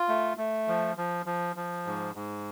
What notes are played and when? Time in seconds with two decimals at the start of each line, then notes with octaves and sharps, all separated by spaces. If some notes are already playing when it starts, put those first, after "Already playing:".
Already playing: F4
0.09 A3
0.37 A3
0.68 F3
0.97 F3
1.26 F3
1.56 F3
1.86 G#2
2.15 G#2